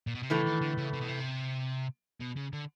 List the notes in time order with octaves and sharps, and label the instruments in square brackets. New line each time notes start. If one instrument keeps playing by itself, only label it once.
[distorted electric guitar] A#2
B2
C3
[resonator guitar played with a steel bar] A2 E3 A3 [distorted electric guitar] C#3
[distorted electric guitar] D#3
D3
C#3
C3
B2
C3
B2
C#3
D3